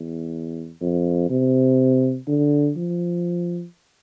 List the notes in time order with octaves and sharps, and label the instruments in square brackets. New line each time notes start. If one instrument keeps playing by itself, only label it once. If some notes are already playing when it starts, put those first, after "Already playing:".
Already playing: [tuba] E2
F2
C3
D3
F3